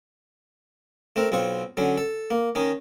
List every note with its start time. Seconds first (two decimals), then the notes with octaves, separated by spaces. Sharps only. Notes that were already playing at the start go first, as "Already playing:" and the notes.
1.16 A3 C4 A#4
1.32 B1 C4 F4 C#6
1.77 D3 F#3 C#4
1.98 A4
2.30 A#3
2.55 D#3 C#4 D#4